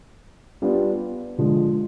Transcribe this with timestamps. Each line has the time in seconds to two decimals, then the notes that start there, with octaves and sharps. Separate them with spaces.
0.62 G3 B3 D4 F4
1.38 D3 F3 G#3